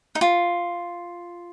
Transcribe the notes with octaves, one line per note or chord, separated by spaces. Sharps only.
D#4
F4